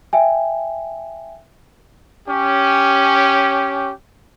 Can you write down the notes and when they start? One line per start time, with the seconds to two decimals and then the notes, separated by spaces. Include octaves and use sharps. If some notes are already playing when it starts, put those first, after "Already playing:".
0.13 E5 G5 G#5
2.29 C#4 G4